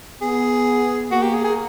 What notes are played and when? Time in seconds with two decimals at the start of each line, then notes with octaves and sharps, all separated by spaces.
0.22 B3 G#4
1.11 A#3 F#4
1.22 G4
1.34 G#4
1.44 G#4